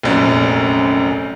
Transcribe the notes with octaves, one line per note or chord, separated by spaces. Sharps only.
F1 A#1 F#2